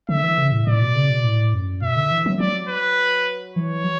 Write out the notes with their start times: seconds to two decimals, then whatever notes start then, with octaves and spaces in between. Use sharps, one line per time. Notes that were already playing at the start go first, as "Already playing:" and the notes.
0.09 D3 E5
0.23 E3
0.38 C#3
0.52 A2
0.67 A2 D5
0.82 B2
0.95 C#3
1.10 B2
1.24 A2
1.54 F#2
1.82 B2 E5
1.96 D3
2.11 E3
2.26 F#3
2.40 F#3 D5
2.68 B4
3.55 E3 C#5
3.84 F#3